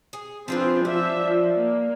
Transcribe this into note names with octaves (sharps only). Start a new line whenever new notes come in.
G#4
F3 C4 D4 F4 G#4 B4
F3 D4 E5
F3
A#3